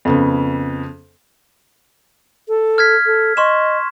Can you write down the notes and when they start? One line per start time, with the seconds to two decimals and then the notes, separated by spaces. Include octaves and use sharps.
0.05 F2 C#3 B3
2.48 A4
2.78 F6 G#6 B6
3.06 A4
3.37 D#5 C6 C#6 E7